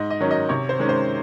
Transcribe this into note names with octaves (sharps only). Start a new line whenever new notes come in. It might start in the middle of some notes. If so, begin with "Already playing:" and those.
Already playing: G#2 D#5
D#5
D#3 F#3 C#4
D#5
C3 C#5
C5
D#3 G#3 C#4
C5